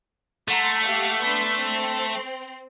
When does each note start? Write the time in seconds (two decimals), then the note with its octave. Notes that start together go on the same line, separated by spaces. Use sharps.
0.48 A3 F#5 A#5 C6
0.84 G4 F5 F#5
1.22 B3 D4 C6
1.59 C4